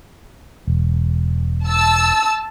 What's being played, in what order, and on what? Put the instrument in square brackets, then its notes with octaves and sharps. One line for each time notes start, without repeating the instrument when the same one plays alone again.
[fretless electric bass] E1
[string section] A5 E6